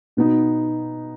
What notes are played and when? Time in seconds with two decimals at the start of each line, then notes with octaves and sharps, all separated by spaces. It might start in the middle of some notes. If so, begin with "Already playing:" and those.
0.17 B2 B3 D#4